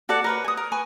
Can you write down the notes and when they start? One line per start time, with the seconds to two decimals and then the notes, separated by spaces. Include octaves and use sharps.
0.09 F#4 A4 D5 F#5
0.24 A#4 B4 C#5
0.44 G#5 D#6
0.57 A#4
0.72 B4 G#5 C#6